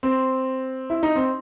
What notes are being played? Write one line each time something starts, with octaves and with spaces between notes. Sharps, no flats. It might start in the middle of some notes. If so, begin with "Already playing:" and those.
C4
E4
D#4
C4